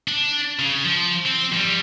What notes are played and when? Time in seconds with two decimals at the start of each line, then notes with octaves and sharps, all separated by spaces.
0.08 D4
0.59 C#3
0.84 F3
1.25 C4
1.52 F2 G3